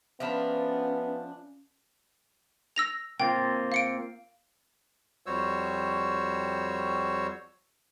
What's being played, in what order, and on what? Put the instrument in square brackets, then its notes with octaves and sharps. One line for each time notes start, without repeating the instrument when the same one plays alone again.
[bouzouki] F3 D4 A5 [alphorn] B3 [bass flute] C#4 [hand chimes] E5 F5 B5
[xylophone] E6 A#6 F7
[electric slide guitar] A#3 C4 F4 [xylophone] G5
[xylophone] F5 C#7 D7
[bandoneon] F2 G3 F#4 C5 C#5 E6